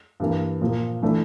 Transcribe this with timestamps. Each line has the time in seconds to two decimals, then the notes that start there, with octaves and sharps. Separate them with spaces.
0.20 G2 E3 A#3
0.61 A#2 F3 A#3
1.02 E3 A3 D4